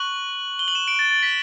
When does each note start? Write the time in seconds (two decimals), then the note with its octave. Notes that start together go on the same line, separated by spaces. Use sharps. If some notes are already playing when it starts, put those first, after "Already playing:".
Already playing: C#6 F#6 F#7
0.59 G7
0.68 F#7
0.75 E7
0.88 D7
0.99 A6
1.11 A6
1.23 B6